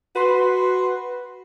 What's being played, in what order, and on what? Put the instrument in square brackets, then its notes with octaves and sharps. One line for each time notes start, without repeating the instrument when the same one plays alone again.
[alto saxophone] F#4 [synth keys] B4 C6